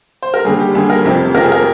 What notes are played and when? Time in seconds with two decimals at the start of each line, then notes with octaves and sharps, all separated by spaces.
0.22 C5
0.34 A#4
0.45 D#2 D3 G3 G#4
0.60 G4
0.75 D#2 D3 G3 G#4
0.90 A#4
1.05 F1 F2 C3 F3
1.34 F1 F2 C3 F3 A#4
1.43 G#4
1.52 A#4